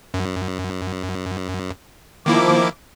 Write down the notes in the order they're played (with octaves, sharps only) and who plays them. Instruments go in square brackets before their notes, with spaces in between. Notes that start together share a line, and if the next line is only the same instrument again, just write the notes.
[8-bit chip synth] F#2
[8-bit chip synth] D#3 A#3 E4 [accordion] F3 D6